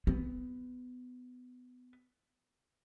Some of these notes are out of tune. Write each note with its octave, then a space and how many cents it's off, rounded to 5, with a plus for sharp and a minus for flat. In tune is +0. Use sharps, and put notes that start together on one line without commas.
B3 +20